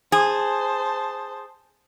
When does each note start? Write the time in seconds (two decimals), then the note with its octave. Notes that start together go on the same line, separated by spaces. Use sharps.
0.12 G#4 C5 A5